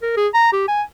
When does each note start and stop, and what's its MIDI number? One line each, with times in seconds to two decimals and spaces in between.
0.02 0.17 70
0.17 0.28 68
0.34 0.51 82
0.53 0.68 67
0.68 0.82 80